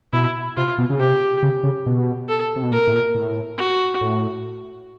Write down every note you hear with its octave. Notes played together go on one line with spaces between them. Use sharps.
B2 E4
C3 F4
B2
C#3
C3 G4
C#3
C#3
B2
A4
C3
B2
A#2 A#4
A2
A#2
A2
F#4
A2